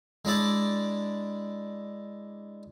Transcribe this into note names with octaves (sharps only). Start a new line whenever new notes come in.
G#3 D4 E4 D5